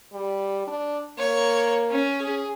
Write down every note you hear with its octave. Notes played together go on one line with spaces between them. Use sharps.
G3
D4
A#3 C#5
C#4
G#4